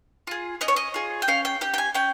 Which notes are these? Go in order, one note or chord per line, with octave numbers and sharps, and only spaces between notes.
F4 G#4
C#4 D#5
C#5
D#5
F4 G#4
G5
C#4 F5
G5
G4 G5
G5
G#5
C#4 G5